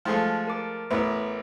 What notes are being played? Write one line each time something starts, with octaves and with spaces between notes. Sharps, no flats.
F3 G#3 A3 F6
A#4 D6
A1 B3